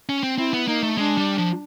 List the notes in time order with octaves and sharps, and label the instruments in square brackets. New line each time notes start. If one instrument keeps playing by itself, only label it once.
[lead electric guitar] C#4
C4
[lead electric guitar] C4 [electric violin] E4
[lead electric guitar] B3
[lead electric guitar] A#3 [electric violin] D#4
[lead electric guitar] A3
[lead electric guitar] G#3 [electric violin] D4
[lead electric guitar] G3
F3